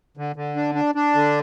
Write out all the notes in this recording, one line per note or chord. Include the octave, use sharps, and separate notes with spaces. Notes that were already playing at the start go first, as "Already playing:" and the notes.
D3
D3
D4
D4
D4
D3